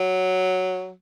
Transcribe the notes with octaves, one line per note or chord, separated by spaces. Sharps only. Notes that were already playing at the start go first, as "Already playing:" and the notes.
Already playing: F#3